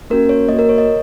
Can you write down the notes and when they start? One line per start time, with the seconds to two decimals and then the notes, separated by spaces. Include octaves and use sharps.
0.10 A#3 C#4 F#4 A#4
0.29 C#5
0.49 A#3 D#5
0.54 F#4
0.59 A#4
0.69 C#5
0.78 D#5